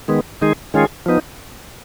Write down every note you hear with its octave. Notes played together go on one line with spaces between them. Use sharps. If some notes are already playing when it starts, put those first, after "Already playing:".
D#3 G#3 B3
D#3 G#3 D#4 G#4
D#3 G#3 C#4 F4 G#4
F3 B3 D#4